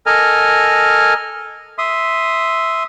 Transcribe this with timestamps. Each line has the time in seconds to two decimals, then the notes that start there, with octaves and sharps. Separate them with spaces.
0.06 A4 A#4 D#5 G#5 F6
1.78 E5 C6 D#6